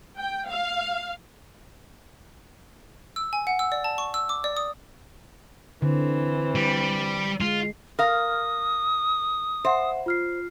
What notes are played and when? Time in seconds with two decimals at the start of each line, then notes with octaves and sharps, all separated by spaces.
0.18 G5
0.48 F5
3.16 E6
3.33 G#5
3.47 F#5
3.59 E6
3.72 D5
3.84 A5
3.98 C#6
4.14 E6
4.29 D6
4.44 D5
4.57 D#6
5.82 D3 E3 C4
6.55 G3
7.41 G#3 F4
7.99 A#4 F5 D#6 F6 A#6
9.65 C5 E5 F#5
10.06 F4 F6 C7